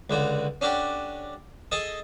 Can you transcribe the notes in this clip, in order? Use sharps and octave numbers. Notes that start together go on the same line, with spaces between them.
C#2 D3 F#4
C#4 D4 F#4 G4 A4
G#4 A4 D#5 A5